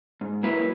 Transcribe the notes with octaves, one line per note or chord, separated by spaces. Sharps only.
G#2
F#3 A#3 E4 B4